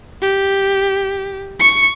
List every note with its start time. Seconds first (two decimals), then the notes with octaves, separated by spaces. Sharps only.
0.22 G4
1.60 C#6 C#7